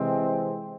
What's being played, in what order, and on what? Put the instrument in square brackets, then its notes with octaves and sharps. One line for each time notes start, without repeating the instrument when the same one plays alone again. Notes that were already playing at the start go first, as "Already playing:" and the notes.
Already playing: [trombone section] C3 E3 G#3 C4